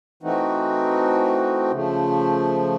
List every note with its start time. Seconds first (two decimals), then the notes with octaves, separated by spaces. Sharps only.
0.23 E3 A3 C4 D#4 F#4
1.71 C#3 F3 A3